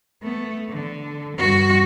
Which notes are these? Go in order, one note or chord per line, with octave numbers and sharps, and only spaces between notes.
A3 B3
D3
G2 F#4